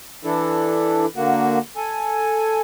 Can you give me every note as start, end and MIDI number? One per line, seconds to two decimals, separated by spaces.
0.24 1.06 52
0.24 1.06 62
0.24 1.06 64
0.24 1.06 69
1.16 1.59 50
1.16 1.59 58
1.16 1.59 66
1.76 2.61 69
1.76 2.61 80